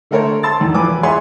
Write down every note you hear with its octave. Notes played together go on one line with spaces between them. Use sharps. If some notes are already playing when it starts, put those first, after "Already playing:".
D3 A3 A4 A#4 C5 C#5
A5 C6 E6 A6
E2 G#2
E1 F3 B4 G#5 D6
G#4 C#5 E5 F#5 G#5 C6